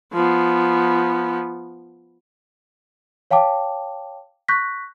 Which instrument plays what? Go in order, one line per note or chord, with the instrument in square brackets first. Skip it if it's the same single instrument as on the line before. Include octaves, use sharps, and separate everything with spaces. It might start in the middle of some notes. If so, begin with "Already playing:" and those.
[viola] F3 B3
[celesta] C#5 F5 G5 A5 D6
C#6 F#6 G6 A#6 B6